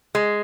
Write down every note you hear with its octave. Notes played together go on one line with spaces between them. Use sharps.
G#3